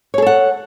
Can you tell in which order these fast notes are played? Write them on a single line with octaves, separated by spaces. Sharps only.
C#5 G#4 A4 F#5